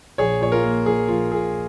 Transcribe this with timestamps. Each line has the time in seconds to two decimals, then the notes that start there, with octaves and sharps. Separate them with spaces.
0.18 A#1 G#4 C#5
0.41 A#2 C#5
0.52 F4 A#4
0.63 A#3
0.86 F3 G#4
1.08 A#1 F4
1.31 A#2 G#4